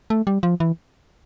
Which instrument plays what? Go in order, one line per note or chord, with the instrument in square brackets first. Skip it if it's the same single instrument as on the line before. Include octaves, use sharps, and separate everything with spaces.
[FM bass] A3
G3
F3
E3